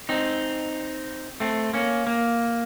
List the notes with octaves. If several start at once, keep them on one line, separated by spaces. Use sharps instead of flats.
C4 D#4
A3 C4
A#3 C#4
A#3